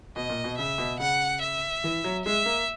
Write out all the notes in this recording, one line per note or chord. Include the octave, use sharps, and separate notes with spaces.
B2 D#5
A#2
B2
C#3 E5
B2
C#3 F#5
E5
E3
F#3
G#3 E5
A#3